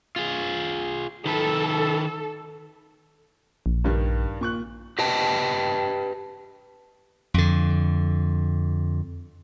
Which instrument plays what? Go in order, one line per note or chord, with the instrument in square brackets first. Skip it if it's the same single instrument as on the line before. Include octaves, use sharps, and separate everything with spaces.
[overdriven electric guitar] F4 G#4
[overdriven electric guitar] D#3 B4 [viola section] A4
[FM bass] A#1
[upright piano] G2 D#3 G3
A#2 C#6 F#6
[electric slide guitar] G4 B4 D#5 G5 A5
[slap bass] F2 D3